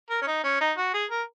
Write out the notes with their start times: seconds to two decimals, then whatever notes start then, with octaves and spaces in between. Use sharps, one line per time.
0.10 A#4
0.22 C#4
0.27 D#4
0.44 C#4
0.61 D#4
0.77 F#4
0.94 G#4
1.11 A#4